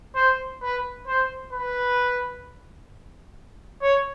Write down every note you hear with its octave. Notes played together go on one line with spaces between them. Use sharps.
C5
B4
C5
B4
C#5